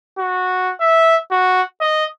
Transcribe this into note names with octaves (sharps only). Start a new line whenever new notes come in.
F#4
E5
F#4
D#5